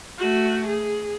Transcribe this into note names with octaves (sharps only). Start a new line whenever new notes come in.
A3 F#4
G#4